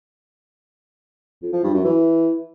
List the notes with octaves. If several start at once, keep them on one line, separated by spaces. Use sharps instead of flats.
F2
F3
G2
F#2
E3